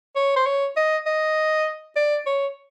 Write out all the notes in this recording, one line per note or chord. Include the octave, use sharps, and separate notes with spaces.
C#5
C5
C#5
D#5
D#5
D5
C#5